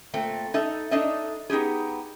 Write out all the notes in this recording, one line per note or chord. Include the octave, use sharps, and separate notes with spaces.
A#2 A3 C4
D#4 A4 E5
D4 D#4 A4 D#5 E5
B3 D#4 E4 G4 G#4